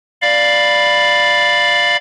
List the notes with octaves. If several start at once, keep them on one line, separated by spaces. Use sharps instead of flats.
D5 F5 B5